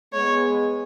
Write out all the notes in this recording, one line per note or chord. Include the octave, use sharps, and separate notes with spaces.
G#3 B3 C#5